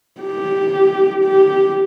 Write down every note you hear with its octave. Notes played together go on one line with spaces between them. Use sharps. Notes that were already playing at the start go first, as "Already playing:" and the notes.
G4
G4